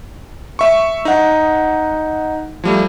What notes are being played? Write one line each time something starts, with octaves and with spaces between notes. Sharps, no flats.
E5 C#6
D#4 F#5
F3 G3 A3